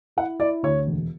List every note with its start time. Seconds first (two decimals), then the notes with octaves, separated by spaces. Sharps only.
0.17 E4 F#5
0.40 E4 D5
0.63 D2 C#5
0.87 E1